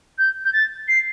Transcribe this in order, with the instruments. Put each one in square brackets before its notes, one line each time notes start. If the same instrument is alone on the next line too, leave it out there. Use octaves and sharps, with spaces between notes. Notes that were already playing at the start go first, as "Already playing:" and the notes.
[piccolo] G6
G6
A6
C7